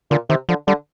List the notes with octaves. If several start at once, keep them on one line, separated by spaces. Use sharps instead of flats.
A#2 D3
C3 D#3
D3 F3
D3 G3